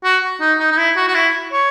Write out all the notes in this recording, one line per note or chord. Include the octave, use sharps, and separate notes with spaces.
F#4
D#4
D#4
D#4
E4
F#4
F#4
E4
C#5